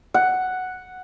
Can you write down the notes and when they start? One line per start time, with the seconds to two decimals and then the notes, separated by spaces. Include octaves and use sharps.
0.14 F#5